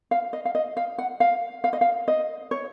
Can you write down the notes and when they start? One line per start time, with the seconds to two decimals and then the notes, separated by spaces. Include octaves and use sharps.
0.11 F5
0.33 D#5
0.45 F5
0.55 D#5
0.77 F5
0.98 F#5
1.20 F5
1.64 F5
1.73 D#5
1.81 F5
2.08 D#5
2.51 C#5